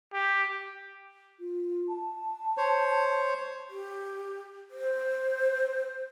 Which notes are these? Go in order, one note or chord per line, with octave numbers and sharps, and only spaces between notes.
G4
F4
A5
C5 C#5
G4
C5